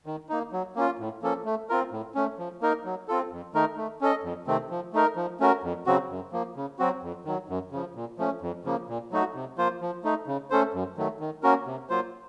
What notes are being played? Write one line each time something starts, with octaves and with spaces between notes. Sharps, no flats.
D#3
A#3 D#4
F#3
A#3 C#4 F4
A2
F3 A#3 C#4 A4
A3
C4 F4 A#4
A2
A3 C#4
F3
A#3 D#4 A#4
F#3
C4 F4 A4
F2
D#3 A3 D#4 A#4
A3
C#4 A4 D#5
F2
C3 D#3 A3 C4
F3
A3 D#4 A#4
F3
A3 C#4 F#4 A#4
F2
C#3 F#3 C4 F#4
F#2
F3 A#3
C#3
F#3 C4 F#4
F2
D#3 F#3
F#2
C#3 F3
A#2
F3 A3 C#4
F2
C#3 F3 A#3
A#2
F#3 A3 D#4 F#4
C3
F3 A#3 F4 C5
F3
A3 D#4
C#3
A3 C#4 A4 C5
F#2
D#3 F#3 A3
D#3
A#3 C#4 F#4 A#4
C3
F#3 A#3 F4 C5